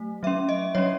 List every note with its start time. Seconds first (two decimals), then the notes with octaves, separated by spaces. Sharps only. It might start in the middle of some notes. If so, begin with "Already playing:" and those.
Already playing: F#3 A3
0.23 F#3 C#4 E5
0.49 D#5
0.75 F#3 C#4 C#5